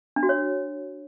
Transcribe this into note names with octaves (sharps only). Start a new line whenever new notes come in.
D4
F#4
C#5